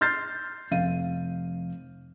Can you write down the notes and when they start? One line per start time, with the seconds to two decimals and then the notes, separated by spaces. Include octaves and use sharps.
0.01 C6 F6 G6 A6 C7
0.71 F1 F5 D#7